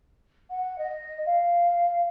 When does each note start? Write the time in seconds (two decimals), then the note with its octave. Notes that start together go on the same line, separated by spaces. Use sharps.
0.50 F#5
0.78 D#5
1.26 F5